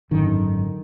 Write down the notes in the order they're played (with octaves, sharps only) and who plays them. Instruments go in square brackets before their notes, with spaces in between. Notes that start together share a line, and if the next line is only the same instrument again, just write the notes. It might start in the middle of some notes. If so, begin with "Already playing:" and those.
[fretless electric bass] G#1 F#2 D3 D#3